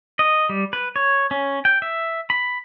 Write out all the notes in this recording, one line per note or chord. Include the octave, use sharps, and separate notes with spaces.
D#5
G3
B4
C#5
C#4
G5
E5
B5